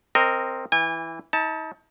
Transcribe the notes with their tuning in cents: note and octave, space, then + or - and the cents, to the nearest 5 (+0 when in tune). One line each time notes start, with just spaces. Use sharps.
C4 +0 A#4 -15 D#5 +0
E3 +0 G#5 -35
D#4 +40 A5 +0